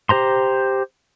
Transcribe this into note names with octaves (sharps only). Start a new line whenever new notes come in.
G4 C5 A#5 C6